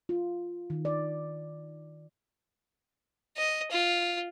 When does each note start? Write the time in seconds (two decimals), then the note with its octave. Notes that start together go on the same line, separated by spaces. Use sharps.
0.09 F4
0.70 D#3
0.85 D5
3.37 D#5
3.71 F4